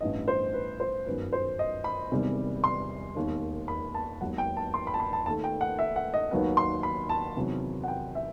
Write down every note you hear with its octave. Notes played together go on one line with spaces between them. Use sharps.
A1 G2 E3 B3 D#5
C5
B4
C5
G1 F#2 D#3 F#3 B4
C5
D#5
B5
E1 E2 C3 D#3 G3
C6
E1 D#2 D#3
B5
A5
E1 D#2 D#3 F#3 F#5
G5
A5
C6
B5
A5
B5
A5
D#2 D#3 A3 A5
G5
F#5
E5
F#5
D#5
D#2 D#3 F#3 B3
C6
B5
A5
E2 C3 D#3 F#3
F#5
G5
E5